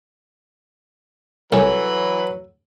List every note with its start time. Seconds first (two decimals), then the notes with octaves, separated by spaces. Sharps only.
1.52 C2 E3 F#3 A4 B4 C#5 G#5